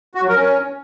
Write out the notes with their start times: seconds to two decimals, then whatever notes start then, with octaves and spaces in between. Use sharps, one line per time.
0.15 F#4
0.22 F#3
0.29 A#4
0.36 C#4